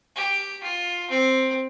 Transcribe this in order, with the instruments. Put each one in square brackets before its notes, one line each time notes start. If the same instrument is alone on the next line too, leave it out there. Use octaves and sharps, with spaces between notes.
[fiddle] G4
F4
C4